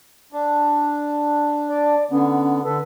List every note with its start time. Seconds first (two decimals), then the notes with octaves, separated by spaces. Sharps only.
0.33 D4
1.69 D5
2.11 D3 B3 C#4
2.64 D3 A4 B4